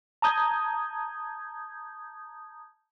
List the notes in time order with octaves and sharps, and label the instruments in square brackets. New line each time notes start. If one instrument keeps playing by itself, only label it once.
[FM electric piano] A5 A#5 D#6 G6 G#6